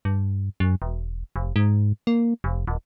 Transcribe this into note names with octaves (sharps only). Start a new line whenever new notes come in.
G2
F#2
E1
F1
G#2
A#3
F1
D#1